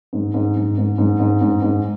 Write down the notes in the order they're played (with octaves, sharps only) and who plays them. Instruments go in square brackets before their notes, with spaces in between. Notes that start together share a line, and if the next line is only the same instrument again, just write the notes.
[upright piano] G#2
G#2
G#2
G#2
G#2
G#2
G#2
G#2